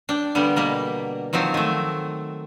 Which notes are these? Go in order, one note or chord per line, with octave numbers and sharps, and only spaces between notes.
D4 G5
D3 G3 A#3 B3
B2 G3 A#3
D#3 F3 F#3 C4
D#3 A3